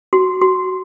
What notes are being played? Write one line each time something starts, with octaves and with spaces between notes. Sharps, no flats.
F#4
F#4